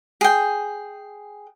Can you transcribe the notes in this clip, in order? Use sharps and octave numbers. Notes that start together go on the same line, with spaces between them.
G#4 G5